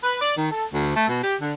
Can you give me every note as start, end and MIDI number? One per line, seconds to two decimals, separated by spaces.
0.04 0.18 71
0.21 0.33 74
0.37 0.50 51
0.52 0.66 69
0.73 0.92 38
0.95 1.06 57
1.09 1.20 47
1.22 1.36 67
1.41 1.53 50